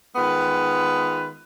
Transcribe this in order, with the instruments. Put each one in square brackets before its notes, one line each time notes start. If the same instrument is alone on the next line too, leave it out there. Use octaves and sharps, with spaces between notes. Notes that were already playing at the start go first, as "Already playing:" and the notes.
[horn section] D#3 G#3 B3 F4 B4